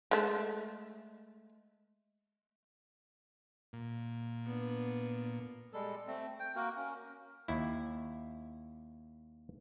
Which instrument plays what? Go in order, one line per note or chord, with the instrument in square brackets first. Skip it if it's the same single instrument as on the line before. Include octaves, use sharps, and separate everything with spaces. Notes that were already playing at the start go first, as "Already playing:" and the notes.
[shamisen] G#3 A3
[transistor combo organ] A#2
[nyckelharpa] B3 D4
[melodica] G3 G#3 A4
A3 C4
G5
A#3 F#4 A#4
C#4 A#4
[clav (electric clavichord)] D#2 E4